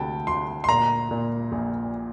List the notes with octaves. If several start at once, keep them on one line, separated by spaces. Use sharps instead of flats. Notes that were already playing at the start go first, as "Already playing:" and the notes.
Already playing: D2 C3 G5 A5
D2 C6
C6
A#2 A#5
A#2
A#1